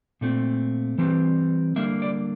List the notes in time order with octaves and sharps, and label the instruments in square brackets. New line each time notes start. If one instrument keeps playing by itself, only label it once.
[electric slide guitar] A#2 A3 C4
E3 G3 C4
D3 G3 A#3 E5
D5